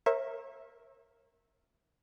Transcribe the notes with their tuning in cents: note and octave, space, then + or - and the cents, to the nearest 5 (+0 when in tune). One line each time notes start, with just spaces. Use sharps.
A#4 +0 C#5 -40 E5 -5